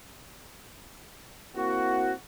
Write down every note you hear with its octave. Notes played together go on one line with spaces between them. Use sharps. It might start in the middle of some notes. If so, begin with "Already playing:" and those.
A#3 C4 E4 F#4